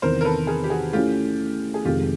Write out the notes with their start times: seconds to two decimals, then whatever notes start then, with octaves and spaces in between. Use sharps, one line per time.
0.02 E2 C3 D#3 A#4 C5
0.21 A#4
0.25 A4 B4
0.47 G#4 A#4
0.64 G4
0.70 F#4 G#4
0.93 A3 C#4 E4 F4 G4
1.74 G#4
1.85 F2 C3 D#3 G#3 F4 G4